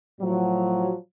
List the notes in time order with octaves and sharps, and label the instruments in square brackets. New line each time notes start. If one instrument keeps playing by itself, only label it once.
[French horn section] A2 F3 F#3